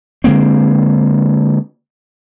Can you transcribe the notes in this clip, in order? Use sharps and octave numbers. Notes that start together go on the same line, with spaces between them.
D3 G#3 A#3 C4